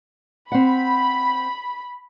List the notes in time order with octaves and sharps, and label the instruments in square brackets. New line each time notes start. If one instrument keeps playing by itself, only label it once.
[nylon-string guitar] C4 F#5 [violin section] B5